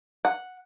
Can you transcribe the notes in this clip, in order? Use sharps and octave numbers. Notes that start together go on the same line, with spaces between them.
F#5